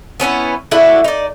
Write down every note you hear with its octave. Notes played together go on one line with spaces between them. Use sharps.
B3 C#4 D#4 E4
A3 D4 E4 F#4
D#4 D5